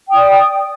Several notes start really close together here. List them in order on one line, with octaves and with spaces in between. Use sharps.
G5 D#6 D5